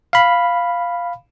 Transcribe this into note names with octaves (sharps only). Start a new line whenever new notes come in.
F5 B5